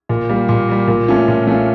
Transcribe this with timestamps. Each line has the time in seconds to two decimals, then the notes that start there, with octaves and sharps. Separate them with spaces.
0.09 A#2
0.29 G3 A#3
0.49 A#2
0.69 G3 A#3
0.87 A#2
1.08 A3 C#4 F4
1.28 A#2
1.47 A3 C#4 F4